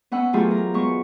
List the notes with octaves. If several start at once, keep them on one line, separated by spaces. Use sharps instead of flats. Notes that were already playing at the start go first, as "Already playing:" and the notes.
B3 C#4 F#5 E6
E3 F#3 A3 F4 G4 G#4
A#4
G#3 B3 C#6